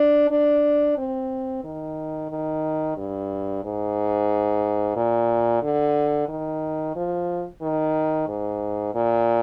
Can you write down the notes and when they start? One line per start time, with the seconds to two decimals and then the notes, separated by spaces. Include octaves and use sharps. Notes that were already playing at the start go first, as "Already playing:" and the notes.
Already playing: D4
0.31 D4
0.98 C4
1.64 D#3
2.31 D#3
2.97 G2
3.64 G#2
4.96 A#2
5.63 D3
6.28 D#3
6.96 F3
7.62 D#3
8.28 G#2
8.95 A#2